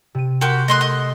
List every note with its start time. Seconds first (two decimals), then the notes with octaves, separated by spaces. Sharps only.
0.15 C3 D#7
0.41 F#4 G4 A#4 C6
0.68 A3 D#5 C6 F#6
0.81 D#5